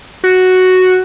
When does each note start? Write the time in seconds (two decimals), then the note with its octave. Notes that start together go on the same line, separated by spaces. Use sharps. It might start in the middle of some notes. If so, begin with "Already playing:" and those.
0.24 F#4